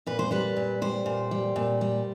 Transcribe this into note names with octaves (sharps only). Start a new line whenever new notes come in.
A#2 B4
C5
G3 B4
A#2
G3 C5
A#2
G3
A#2
G3